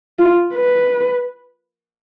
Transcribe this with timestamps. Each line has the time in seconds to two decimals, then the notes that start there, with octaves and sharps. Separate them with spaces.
0.19 F4
0.54 B4